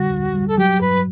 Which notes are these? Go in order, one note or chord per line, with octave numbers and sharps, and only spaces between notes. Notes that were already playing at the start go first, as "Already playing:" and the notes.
Already playing: D3 G3 F#4
D2
G3
A4
F#3 G4
G2 B4